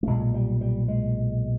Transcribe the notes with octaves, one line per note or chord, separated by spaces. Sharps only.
A3
B1 A#2 G#3
G3
G3
G#3